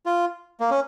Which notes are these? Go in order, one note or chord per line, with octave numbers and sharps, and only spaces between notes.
F4
A#3
C#4